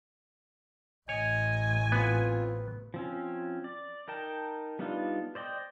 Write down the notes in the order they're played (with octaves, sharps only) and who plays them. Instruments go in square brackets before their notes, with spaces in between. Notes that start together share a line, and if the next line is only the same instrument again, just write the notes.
[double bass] A1 [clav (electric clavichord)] C#5 [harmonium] D#5 [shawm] G#5
[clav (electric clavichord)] B3 [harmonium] C4 F4
[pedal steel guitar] F3 C4 C#4
D5
D#4 A#4 G5 A5
G3 B3 D4 D#4 F4
C5 D5 D#5 G5